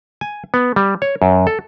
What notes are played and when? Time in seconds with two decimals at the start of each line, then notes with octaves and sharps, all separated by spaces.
0.21 G#5
0.54 B3
0.76 G3
1.02 C#5
1.22 F#2
1.47 A4